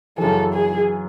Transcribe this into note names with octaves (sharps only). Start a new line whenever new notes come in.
F#2 C#3 E3 A4
G#4